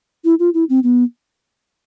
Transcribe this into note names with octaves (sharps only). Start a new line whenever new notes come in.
E4
F4
E4
C4
B3